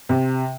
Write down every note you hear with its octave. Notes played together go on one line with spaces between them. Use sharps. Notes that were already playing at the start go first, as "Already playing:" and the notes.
C3